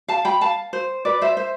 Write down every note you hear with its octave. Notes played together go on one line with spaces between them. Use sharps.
F5 A5
G5 B5
F5 A5
C5
B4 D5
C5 E5
C5 E5